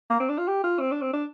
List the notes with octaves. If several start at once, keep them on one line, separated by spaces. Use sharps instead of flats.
A#3
C4
D4
F4
G4
F4
C4
D4
C4
D4